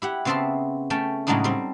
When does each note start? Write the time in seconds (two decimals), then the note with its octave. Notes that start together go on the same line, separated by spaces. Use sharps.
0.02 E4 G4 F#5
0.25 C#3 B3 C4 E5 A5 C6
0.90 A3 C#4 G5 A5
1.27 A2 C#3 F#3 G#3 D4 D#4
1.44 G3 C4